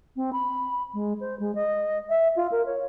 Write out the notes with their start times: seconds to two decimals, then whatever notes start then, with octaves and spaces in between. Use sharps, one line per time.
0.16 C4
0.33 B5
0.94 G#3
1.20 C5
1.39 G#3
1.55 D#5
2.09 E5
2.36 F4
2.52 A#4
2.66 C#5